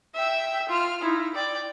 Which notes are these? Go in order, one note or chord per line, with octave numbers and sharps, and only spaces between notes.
E5 G5
F4 F6
D#4 E4
D5 G5